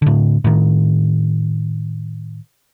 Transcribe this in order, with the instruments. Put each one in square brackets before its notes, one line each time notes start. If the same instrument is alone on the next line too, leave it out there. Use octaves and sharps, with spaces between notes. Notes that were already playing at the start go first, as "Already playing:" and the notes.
[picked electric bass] A2 D3
A2 D#3